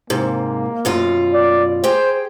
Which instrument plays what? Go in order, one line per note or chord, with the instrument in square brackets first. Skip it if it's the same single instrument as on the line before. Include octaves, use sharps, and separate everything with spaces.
[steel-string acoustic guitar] G#2 C3 [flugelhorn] A#3
[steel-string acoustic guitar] F#2 B2 F4
[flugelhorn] D5
[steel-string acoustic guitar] G4 G#4 G5 [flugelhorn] C5